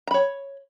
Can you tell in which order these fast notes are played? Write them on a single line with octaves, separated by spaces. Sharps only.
A#5 B5 C#5